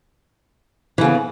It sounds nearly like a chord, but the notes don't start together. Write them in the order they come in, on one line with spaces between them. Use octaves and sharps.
E3 C#3 B3